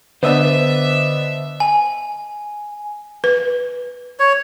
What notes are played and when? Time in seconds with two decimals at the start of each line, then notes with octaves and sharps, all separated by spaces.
0.23 D3 B3 D4 C5 D#5 E5 E6
1.60 G#5
3.24 B4
4.20 C#5